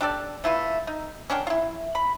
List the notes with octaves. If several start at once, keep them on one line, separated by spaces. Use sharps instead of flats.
D4 G4 A4 D5
A3 E4 F4 B4
D#4
C#4 D4 A#4 G5
E4 F4
B5